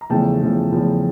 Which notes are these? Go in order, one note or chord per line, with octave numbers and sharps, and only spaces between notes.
A#5
E2 C#3 F3 A3 G5 A5
E2 C#3 F3 A3
E2 C#3 F3 A3